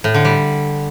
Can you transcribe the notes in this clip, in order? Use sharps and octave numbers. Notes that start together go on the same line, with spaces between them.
A2
D3
G3